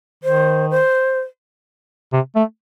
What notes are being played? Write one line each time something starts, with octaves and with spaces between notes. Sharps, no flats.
D#3 C5
C5
C3
A3